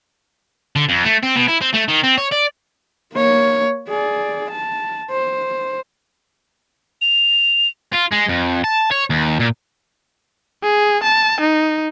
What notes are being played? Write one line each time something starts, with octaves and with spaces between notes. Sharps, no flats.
D3
F2
A3
C4
B2
E4
C4
A3
D#3
C4
C#5
D5
A#3 C#5
G#4 D5
A5
C5
F7
F4
G#3
F2
A5
C#5
D#2
A#2
G#4
A5
D#4